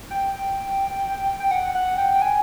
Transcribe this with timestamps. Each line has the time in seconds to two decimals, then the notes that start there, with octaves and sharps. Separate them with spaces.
0.10 G5
1.40 G5
1.51 F#5
1.75 F#5
1.98 G5
2.22 G#5